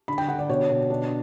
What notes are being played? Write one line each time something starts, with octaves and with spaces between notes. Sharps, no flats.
D3 B5
G5
D3 F#5
D5
B2 C#5
B2
D4